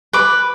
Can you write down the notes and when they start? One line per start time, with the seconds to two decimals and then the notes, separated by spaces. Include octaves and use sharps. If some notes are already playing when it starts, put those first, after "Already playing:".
0.13 B4 D6